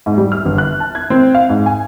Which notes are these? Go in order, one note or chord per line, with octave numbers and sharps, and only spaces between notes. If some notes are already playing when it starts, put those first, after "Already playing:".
G#2
G3
F6
G1
F#6
A5
G#6
C4
F5
G#2
G#5